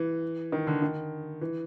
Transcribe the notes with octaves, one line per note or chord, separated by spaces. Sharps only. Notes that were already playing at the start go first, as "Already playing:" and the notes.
Already playing: E3
D#3
D3
D#3
E3